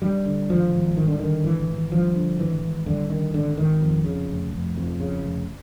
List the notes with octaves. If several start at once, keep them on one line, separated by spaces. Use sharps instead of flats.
G2 G3
D3
G#1 F3
G#1
G2 D#3
D3
D3 D#3
G#1 E3
G#1
G2 F3
D3
G#1 E3
G#1
G2 D3
D3 D#3
G#1 D3
G#1 D#3
F2
C#3
F1
F1
F2
C#3
F1